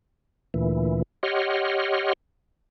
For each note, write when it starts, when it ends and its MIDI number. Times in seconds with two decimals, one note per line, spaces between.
0.54 1.02 38
0.54 1.02 46
0.54 1.02 52
1.23 2.13 67
1.23 2.13 73
1.23 2.13 75
1.23 2.13 78
1.23 2.13 84
1.23 2.13 89